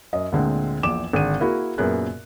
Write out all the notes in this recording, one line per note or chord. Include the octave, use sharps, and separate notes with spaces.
F#2 D#5
D2 A#2 D3 G#3 C4
A#1 E2 D6 E7
G#1 D3 G#4 D#7
A#3 E4 F#4 G#4
F#2 A#2 B3 G#4 A#4 F#6